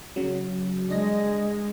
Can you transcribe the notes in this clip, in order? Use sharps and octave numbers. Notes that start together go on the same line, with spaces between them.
C#3 F#3
G#3 D4 D#5 A#6